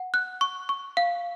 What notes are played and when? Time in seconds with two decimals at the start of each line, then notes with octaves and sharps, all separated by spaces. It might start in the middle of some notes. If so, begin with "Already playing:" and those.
Already playing: F#5
0.14 F#6
0.41 C#6
0.69 C#6
0.97 F5